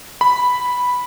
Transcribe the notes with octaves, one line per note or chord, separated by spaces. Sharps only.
B5